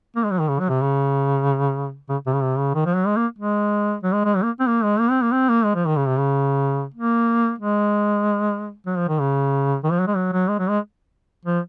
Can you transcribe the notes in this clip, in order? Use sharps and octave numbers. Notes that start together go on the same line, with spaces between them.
A#3
G#3
F#3
D#3
C#3
F#3
C3
C#3
C#3
C3
C#3
C3
C#3
D#3
F3
F#3
G#3
A#3
G#3
F#3
G#3
G#3
F#3
A#3
C4
A#3
G#3
A#3
C4
A#3
C4
A#3
G#3
F3
D#3
C#3
C3
C#3
A#3
G#3
F#3
F3
D#3
C#3
D#3
F3
F#3
G#3
F#3
F#3
G#3
F#3
G#3
F3